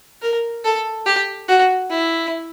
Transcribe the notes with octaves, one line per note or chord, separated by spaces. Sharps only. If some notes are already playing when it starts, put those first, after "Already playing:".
A#4
A4
G4
F#4
E4